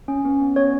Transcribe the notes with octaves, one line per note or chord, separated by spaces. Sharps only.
C#4
B3
B3
C#4 C#5